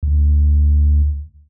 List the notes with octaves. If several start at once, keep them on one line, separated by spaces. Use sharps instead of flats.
D2